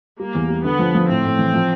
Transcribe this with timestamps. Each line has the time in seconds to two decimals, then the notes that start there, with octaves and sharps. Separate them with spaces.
0.19 G3 A#3
0.35 E2
0.49 G3
0.64 D3 B3
0.79 F3
0.95 F3
1.09 A2 C4
1.25 A2
1.39 E3
1.54 F3